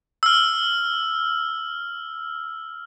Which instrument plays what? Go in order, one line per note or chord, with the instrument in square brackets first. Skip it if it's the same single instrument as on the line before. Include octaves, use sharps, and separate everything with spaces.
[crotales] E6 F6